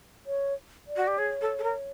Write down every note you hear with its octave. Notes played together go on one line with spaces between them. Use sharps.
C#5
D5
F#4
G4
G#4 C#5
A4
A4
A#4